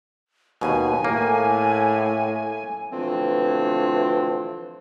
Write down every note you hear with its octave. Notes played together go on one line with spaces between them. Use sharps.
D#2 B2 G#5
A2 A#3
B2 D3 E3 F3 A3 C4